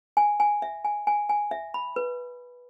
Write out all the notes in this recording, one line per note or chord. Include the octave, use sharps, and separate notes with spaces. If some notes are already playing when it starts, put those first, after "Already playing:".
G#5
G#5
E5
G#5
G#5
G#5
E5
B5
B4